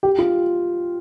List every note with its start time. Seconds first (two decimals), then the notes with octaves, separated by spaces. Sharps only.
0.03 G4
0.19 F4